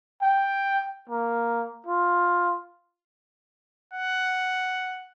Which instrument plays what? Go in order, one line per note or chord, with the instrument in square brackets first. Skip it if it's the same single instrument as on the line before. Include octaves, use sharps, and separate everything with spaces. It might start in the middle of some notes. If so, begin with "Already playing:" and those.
[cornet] G5
A#3
F4
[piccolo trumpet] F#5